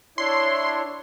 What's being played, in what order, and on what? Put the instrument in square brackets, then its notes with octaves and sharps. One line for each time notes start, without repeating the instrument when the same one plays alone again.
[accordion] D4 E4 C#5 [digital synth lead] C6